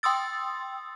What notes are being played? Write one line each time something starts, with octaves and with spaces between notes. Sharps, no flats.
G5 C6 D#6 E6 A6